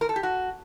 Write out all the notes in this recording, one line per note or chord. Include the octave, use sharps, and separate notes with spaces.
A#4
A4
G4
F#4